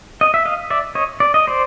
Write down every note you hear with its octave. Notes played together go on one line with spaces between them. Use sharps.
D#5
E5
D#5 F5
D5 E5
C#5 D#5
D5
D#5
C5 D5